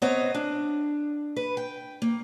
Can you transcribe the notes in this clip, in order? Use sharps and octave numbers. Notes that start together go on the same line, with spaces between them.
B3 C4 C#5 D#5 A#5
D4
B4
G5
A#3